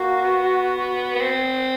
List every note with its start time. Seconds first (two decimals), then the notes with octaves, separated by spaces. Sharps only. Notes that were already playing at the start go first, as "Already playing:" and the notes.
Already playing: A#3 F#4
0.24 B3
1.15 B3
1.21 C4